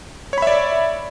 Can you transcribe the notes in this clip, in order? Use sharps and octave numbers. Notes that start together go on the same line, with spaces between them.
C#5 D5 E5 B5